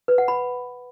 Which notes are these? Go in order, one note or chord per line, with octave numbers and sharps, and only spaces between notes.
B4
F#5
B5